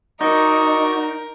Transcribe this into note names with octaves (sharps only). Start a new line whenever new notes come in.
D#4 F#4 A#4 D5 D#5 C#6